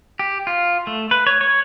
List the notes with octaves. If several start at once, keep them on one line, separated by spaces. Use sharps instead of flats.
G4
F4
A3
B4
C#5
C#5